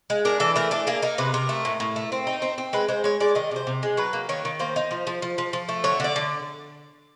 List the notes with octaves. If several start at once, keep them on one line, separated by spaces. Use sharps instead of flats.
G#3
D4 A#4
E3 A4
A3 A#4
D4 A4
A#3 G#4
D#4 A#4
C3 B4
C3 A#4
A3
A2
A2
A3
C4
D#4
C4
C4
G#3 B4
G#3 C5
G#3 C#5
G#3 D5
D#3 D#5
C3 C5
C3
G#3
F#3 B4
A#3
D#3 C#5
D#3
A#3 C5
D#4
F3
F3
F3
F3
F3
A3
D3 C#5
D3 D5
D3